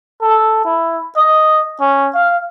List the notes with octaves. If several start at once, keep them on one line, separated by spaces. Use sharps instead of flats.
A4
E4
D#5
C#4
F5